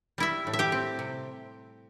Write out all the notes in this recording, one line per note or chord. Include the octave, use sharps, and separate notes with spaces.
G3 E4 E5
A2
E5
G4 G5
C4
C3